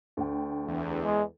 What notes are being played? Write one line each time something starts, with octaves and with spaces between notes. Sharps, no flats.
D2 G5
E2
G#3